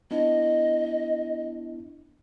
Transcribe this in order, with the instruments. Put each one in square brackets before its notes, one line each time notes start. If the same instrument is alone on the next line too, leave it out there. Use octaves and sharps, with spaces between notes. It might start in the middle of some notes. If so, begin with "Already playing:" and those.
[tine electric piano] B3 D4 E4 [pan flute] D#5